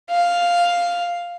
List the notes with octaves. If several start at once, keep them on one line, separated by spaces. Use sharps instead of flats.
F5